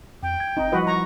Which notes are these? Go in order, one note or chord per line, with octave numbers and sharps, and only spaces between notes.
F2 G5
G#6
G1 C4 D#4
F3 G3 E4 F#4 B4 D#5
A#5 C#6